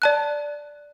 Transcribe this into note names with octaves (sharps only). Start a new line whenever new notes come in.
D5 A5 F#6